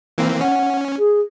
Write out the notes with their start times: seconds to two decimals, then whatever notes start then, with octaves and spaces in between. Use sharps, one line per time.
0.18 E3 A#3 C4
0.41 C#4 F#5
0.99 G#4